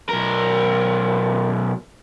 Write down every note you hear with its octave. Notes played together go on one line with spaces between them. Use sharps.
B1 A#4